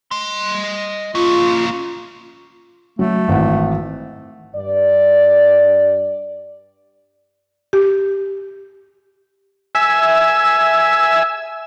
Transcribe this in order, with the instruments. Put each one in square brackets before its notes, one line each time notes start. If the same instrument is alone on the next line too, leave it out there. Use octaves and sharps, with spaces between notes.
[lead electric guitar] D#5 C6
[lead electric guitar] A#3 C#4 [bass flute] F4
[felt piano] F#3 [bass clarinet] A3
[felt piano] G#1 E3 F#5
[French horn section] G2 D5
[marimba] G4
[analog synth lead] E5 [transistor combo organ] G#5 E6